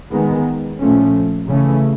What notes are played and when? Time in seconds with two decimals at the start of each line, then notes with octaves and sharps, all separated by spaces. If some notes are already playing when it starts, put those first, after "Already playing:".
0.11 D#3 G#3 B3
0.80 A#2 F3 A3 C#4
1.48 C#3 E3 A3 C#4